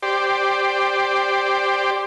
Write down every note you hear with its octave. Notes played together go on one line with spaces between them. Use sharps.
G4 C5 D5